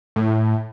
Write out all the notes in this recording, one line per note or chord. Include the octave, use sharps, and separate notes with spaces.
A2